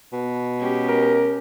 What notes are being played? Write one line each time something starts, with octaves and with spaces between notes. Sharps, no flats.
B2
G#3 C#4 G4
A#4